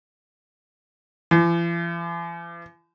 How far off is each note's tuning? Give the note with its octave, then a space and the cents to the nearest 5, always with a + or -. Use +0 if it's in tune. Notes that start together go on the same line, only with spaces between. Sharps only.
E3 +45